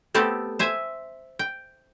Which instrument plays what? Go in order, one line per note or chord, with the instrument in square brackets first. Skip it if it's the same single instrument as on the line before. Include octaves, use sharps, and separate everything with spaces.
[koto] A3 B3 C4 G4 A4
C5 E5 G#5
G5